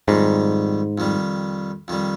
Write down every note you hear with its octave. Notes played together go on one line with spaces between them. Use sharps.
F2 G#2 D#3 G3
F2 D#3 G3
F2 D#3 G3